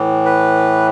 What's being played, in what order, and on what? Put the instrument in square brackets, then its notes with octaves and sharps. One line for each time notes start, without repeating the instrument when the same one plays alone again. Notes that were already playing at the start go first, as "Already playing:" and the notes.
Already playing: [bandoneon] A2 E3
B4